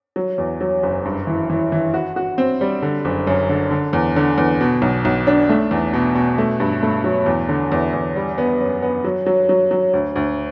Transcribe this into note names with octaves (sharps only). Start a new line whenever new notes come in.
F#3
E2
F#3
F#1
G2
E3
E3
E3
F#4
F#4
C4
G3
D3
F#1
F#2
D3
D3
E2
D3
E2
B2
B1
B1
D4
A3
E2
B2
B2
A3
G2
A3
F#3
E2
D3
E2
E2
G3
B3
F#2
B3
F#3
F#3
F#3
F#3
D2
D2